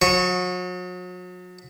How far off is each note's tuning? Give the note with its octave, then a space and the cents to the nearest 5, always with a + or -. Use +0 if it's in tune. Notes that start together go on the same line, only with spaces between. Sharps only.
F#3 -40 C#6 -10